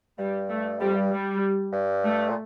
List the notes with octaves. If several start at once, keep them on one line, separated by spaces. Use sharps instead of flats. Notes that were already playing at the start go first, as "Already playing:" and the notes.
G2 G3
A3
F2 G3
G2
G3
G2
A3
A#2